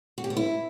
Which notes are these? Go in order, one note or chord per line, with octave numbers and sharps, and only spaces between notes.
F#4
G4
B3
E4